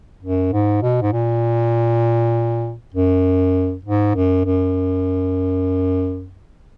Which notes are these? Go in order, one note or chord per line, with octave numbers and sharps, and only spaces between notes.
F#2
G#2
B2
G#2
A#2
F#2
G#2
F#2
F#2